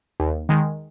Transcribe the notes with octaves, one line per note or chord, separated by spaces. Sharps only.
D#2
D#3 G#3